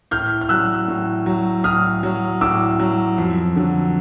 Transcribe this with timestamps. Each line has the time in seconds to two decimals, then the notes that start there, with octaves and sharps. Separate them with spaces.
0.11 A2 F6 G6
0.41 F6
0.49 F#3 E6 F#6
0.88 A2
1.26 F#3
1.64 A2 D#6 F6
2.03 F#3
2.41 A2 D6 E6
2.80 F#3
3.18 F2
3.56 D3 F#3